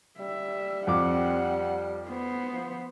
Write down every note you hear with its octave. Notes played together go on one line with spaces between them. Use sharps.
G3 E5
F2 C4 F#5 D6
B3 C5
F3